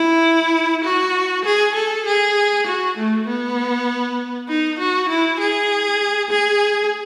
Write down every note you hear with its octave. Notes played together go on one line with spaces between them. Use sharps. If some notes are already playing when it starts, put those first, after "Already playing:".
Already playing: E4
F#4
G#4
A4
G#4
F#4
A3
B3
D#4
F#4
E4
G#4
G#4